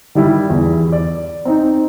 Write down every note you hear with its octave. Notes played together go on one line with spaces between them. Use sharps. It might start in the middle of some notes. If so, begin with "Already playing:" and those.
D#3 G3 E4
E2
D5
C4 D#4